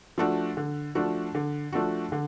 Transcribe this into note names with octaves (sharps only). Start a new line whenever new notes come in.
F3 A3 D4 F#4
D3
F3 A3 D4 F#4
D3
F3 A3 D4 F#4
D3